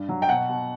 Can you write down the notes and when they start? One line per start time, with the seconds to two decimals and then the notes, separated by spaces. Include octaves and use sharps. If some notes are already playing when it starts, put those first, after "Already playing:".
Already playing: G2
0.09 F#3
0.22 G5
0.28 B2 F#5
0.49 B2